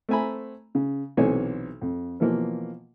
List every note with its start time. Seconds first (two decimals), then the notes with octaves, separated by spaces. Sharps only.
0.09 A3 C4 E5 G#5 A#5 B5
0.75 C#3
1.17 B1 C3 E3 C5 C#5 G#5
1.82 F2
2.20 B2 E3 F3 A#3